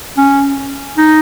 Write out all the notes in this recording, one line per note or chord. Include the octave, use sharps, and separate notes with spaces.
C#4
D#4